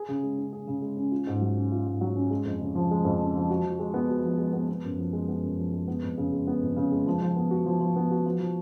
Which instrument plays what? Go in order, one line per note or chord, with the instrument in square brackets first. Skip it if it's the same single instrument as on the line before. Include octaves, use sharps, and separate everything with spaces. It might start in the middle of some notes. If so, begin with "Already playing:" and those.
Already playing: [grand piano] G#4
C#3
G#3
C#4
G#4
C#3
G#3
C#4
F4
G#2
F#3
C#4
F4
G#2
F#3
C#4
G#3
F2
C#3
F3
G#3
F2
C#3
F3
F#4
F3
G#3
B3
F#4
F3
G#3
B3
B3
F#2
F3
G#3
B3
F#2
F3
G#3
B3
F2
C#3
G#3
B3
F2
C#3
G#3
F3
F3
B3
F#4
F3
F3
B3
F#4
F3
F3